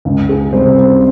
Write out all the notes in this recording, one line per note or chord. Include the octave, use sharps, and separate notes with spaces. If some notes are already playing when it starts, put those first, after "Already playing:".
C#2
G#4
C3 G3 C5
C5